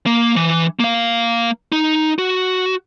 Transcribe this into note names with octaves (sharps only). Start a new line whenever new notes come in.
A#3
E3
A#3 F5
D#4
F#4